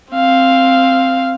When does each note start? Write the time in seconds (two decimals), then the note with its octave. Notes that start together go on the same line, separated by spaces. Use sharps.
0.13 C4 F5